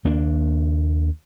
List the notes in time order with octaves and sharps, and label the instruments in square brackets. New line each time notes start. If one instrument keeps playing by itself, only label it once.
[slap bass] D#2 A#3 D4